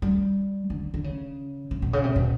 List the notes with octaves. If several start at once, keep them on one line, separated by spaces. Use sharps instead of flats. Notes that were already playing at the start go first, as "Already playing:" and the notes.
G3
D3
D3
C#3
C#3
B2
C#3
C3
B2